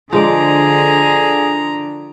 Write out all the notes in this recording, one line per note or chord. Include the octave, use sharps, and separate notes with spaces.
D3 F3 G#3 G#4 D5 A#5